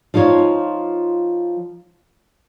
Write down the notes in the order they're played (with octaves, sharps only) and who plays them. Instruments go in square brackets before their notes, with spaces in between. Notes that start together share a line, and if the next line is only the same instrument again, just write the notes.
[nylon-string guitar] F3 D#4 F4 C#5